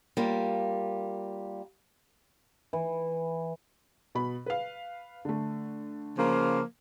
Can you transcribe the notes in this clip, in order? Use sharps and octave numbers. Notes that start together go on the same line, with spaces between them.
G3 A#3 F4
E3
B2 B5
B4 F5
D3 A3
C#3 F3 A#3